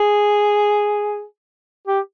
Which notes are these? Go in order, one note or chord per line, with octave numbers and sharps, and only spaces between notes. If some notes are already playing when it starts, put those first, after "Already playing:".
Already playing: G#4
G4